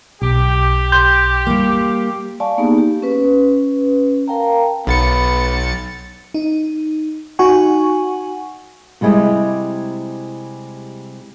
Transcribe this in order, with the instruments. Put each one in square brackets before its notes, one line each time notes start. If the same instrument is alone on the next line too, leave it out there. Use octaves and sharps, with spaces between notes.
[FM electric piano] B1 [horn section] G4
[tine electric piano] C6 G6
[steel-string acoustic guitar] G3 A#3
[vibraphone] D5 F5 G#5 A5 C#6
A#3 B3 D#4 G4 G#4
G4
C#4 B4
A#4 F5 G5 A5 A#5
[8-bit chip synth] B1 A6 C#7 [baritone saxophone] B3
[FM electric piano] D#4
D#4 F#4 F#5 G#5 C#6
[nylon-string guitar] C3 G3 G#3 E4 G4 D#5